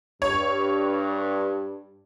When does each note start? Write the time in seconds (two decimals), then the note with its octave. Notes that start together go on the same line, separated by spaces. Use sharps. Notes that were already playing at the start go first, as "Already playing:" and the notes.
0.22 G2 C#5